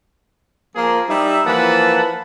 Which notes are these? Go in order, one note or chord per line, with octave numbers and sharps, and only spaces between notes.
F3 A#3 G#4
G3 D#4 E5
E3 F3 A#3 B4 F#5 A5